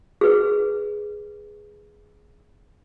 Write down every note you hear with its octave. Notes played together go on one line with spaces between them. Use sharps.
G#4 B4